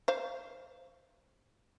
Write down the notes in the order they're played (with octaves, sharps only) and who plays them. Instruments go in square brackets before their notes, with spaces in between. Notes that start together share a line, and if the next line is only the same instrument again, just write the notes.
[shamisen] C5 F5